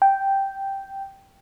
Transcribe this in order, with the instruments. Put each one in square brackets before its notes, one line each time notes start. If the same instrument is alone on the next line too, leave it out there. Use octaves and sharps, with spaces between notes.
[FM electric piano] G5